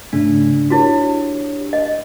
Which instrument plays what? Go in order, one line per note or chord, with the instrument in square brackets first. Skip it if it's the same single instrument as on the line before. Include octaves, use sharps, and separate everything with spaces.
[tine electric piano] G#2 C#3 A3 [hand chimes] D4
[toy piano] E4 F#4 [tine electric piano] G4 C#5
[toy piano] D#5